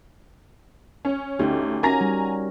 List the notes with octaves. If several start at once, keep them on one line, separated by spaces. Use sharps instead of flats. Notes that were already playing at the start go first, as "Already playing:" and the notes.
C#4
D2 C#4 D#4 G4
C#4 F#4 A#4 G#5 A#5 A#6
G3